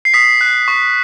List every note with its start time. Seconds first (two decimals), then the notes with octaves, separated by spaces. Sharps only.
0.05 C7
0.14 D#6 B6
0.41 F#6
0.68 C#6